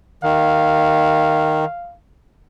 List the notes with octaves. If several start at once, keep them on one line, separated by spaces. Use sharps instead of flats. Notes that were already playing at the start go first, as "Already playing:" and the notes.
D#3 F5